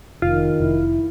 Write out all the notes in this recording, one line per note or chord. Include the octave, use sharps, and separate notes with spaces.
F1 D#3 F4
F1 E4